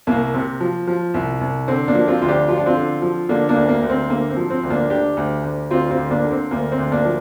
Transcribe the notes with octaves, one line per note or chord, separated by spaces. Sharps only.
C2 A#3
C3
F3
F3
C2
C2
D3 C4
A#3 D4
F3
C4 F4
D2 F4
D4 G4
F3 F4
D4
C4 F4
D3
F3
D3 A#3 D4
A#3 D4
D2
A#3
D2
C4
D3 A#3
C4
F3
C4
D2
A#3 D4
D3 D4 G4
D2
D2
D2 C4 F4
C4 F4
D2
A#3 D4
D3
C4
D2 A#3
C4
D2
A#3 D4
F3